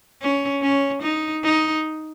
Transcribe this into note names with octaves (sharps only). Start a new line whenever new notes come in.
C#4
C#4
D#4
D#4